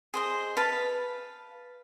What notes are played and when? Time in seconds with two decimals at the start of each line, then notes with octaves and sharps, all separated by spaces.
0.14 G#4 C5 D#5
0.57 B4 F5 A5